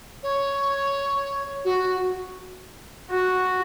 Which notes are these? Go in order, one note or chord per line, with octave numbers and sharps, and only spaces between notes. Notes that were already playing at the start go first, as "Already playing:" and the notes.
C#5
F#4
F#4